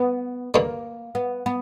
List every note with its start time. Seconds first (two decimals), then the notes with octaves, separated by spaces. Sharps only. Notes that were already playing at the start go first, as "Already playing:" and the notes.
Already playing: B3
0.54 G2 D3 G3 A#3
1.15 B3
1.46 B3